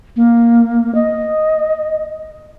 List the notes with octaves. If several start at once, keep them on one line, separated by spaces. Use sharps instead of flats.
A#3
D#5